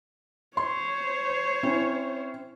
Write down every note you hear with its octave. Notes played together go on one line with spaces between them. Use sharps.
C5 C#5 C6
C4 C#4 E4